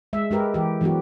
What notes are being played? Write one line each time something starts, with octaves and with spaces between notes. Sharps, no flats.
G#3 E5
G#3 G4 A#4 B4
E3 G4
E3 F#3 B3 F#4 G4